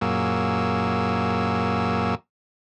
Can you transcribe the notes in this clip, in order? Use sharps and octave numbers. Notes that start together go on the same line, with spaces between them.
F#2 A#2 F#3 A#3 G#4 E6